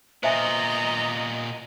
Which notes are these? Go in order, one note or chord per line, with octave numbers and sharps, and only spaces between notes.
A#2 B3 C5 D#5 E5 G#5 A#5